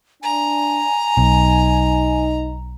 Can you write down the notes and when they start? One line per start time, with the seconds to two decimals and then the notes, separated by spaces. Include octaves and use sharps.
0.23 D4 G#5 A#5
1.17 B1 D#4